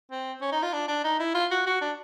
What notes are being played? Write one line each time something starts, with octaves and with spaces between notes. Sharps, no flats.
C4
C#4
D#4
F4
D4
D4
D#4
E4
F4
F#4
F#4
D4